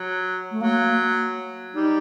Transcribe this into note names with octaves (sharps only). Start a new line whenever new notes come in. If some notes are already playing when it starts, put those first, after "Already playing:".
Already playing: F#3
A3
F#3 A#3
G3 D#4